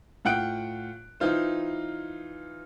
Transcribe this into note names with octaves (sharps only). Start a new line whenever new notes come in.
A2 F4 F#5 G5 F#6 D7
E3 D#4 F4 C5